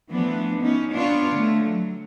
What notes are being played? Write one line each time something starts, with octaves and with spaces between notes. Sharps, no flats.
E3 F3 A3 B3 D4
B3 C#4 D#4
B3 D4 F4 C#5
D3 A3
F#3